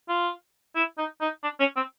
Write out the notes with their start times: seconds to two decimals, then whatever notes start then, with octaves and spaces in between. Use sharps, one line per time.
0.09 F4
0.76 E4
0.98 D#4
1.21 D#4
1.43 D4
1.60 C#4
1.76 C4